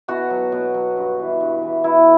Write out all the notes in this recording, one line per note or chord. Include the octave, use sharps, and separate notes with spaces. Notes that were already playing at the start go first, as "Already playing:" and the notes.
B2 F#4
F#3
B2
F#3
G2
E3
G2
E3
B2 E4